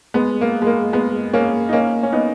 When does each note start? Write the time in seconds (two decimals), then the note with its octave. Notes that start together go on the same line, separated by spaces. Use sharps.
0.14 G#3 B3
0.41 A#3
0.62 G#3
0.67 A#3
0.93 G#3 B3
1.33 A#3 C#4
1.69 D#4
1.73 A#3 C#4
2.03 C#4
2.12 B3 D#4